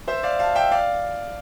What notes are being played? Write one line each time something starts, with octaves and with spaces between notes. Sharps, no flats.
C5 E5
D5 F5
F5 A5
E5 G5
D5 F5